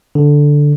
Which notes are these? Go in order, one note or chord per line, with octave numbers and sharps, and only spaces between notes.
D3